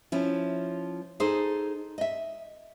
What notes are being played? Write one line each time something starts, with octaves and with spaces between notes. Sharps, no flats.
F3 C#4 E4
D#4 G#4 A4 C5
D#5 E5